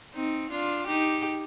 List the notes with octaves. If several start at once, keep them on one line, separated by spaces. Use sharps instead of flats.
C4 D#4
D4 F4
D#4 G4